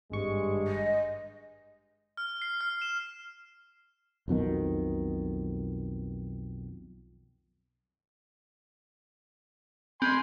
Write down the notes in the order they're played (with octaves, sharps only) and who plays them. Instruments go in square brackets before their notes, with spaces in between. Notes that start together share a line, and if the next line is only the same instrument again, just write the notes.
[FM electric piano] G#1 C#6 [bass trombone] G2 [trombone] G#3
[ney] D#5
[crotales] F6
C7
F6
E7
[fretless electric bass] B1 F2 B2 D#3
[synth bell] C4 [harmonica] G#5 B5 C6